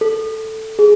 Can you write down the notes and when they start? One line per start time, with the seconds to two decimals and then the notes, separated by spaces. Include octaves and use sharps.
0.01 A4
0.79 G#4